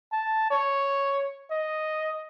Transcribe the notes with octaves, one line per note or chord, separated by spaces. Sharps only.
A5
C#5
D#5